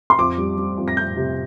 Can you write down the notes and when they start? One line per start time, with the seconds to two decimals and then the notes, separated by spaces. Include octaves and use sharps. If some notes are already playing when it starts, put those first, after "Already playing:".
0.10 C6
0.18 F2 D6
0.38 G3
0.57 G3
0.77 F2
0.88 A#6
0.97 F2 G6
1.17 C3